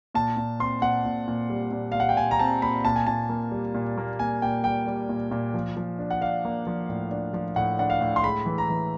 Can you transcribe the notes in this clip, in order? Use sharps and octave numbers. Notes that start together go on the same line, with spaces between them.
A#2 A5
A#2
C4 C6
A#2 F#5
A#2
A#2
G3
A#2
A#2 F5
F#5
G5
A#2 G#5
A#5
C4 A5
A#2 B5
A#2 A5
G#5
A#2 A5
A#3
G3
A#2
A#3
A#2 G#5
A#2 G5
G3 G5
G3
A#2
A#2
F3
F3
D4
F#5
D4 F5
A#3
F3
A2
D4
F3
A2 F#5
D4 F#5
F5
A2
C6
G#3 B5
E3
A#5
E3